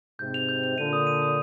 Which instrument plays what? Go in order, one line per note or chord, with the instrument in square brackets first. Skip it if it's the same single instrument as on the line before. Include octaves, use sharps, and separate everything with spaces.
[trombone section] G#2 C3 [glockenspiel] G6
[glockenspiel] F7
G6
F7
[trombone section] A#2 D3 [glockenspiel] D#7
[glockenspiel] D#6
D#7
D#6